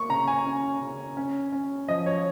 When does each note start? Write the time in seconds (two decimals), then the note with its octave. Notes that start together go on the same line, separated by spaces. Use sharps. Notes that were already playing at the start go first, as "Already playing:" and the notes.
Already playing: A#3 C#6
0.09 C#3 A#5
0.28 G#5
0.46 C#4
0.80 C#3
1.17 C#4
1.52 C#4
1.88 F3 D#5
2.06 C#5